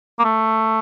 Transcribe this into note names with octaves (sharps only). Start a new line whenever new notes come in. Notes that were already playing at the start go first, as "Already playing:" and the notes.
A#3
A3